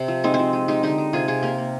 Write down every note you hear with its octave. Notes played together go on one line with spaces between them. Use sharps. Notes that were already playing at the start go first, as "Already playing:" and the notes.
Already playing: C3
F3
G#3 C4 D#4
C4
F3
G#3
G#3 D#4 G4
D3 D#4 G4
G#3
C3 F4 G#4
C3 F4 G#4
A#3 G4 A#4
A#3